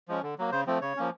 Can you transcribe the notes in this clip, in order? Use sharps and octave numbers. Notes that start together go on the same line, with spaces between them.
F3 G#3 C#4
D3
F#3 A#3
C#3 C5
F3 A3 C4
C#3 C#5
F3 A#3 C#4